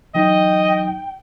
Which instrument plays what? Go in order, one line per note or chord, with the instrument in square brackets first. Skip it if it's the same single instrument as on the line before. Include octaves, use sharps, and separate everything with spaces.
[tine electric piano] E3 F#3 D#4 [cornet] D#5 [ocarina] G5